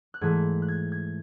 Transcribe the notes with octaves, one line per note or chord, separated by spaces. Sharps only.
F#6
G#2 E3 A3 G#6
F#6
G#6
G#6